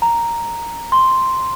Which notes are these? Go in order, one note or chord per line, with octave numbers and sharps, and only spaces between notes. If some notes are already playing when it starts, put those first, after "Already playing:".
A#5
C6